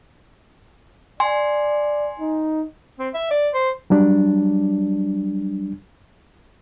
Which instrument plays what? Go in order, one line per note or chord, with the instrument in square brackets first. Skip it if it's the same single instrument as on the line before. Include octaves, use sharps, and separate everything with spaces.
[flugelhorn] D5 [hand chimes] G#5 C6
[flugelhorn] D#4
[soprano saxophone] C4
E5
D5
C5
[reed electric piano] F#3 G3 D4